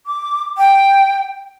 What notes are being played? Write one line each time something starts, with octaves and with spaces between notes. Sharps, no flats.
D6
G5